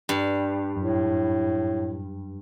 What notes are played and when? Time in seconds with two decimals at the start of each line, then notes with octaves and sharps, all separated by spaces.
0.09 G2
0.76 F#2 A2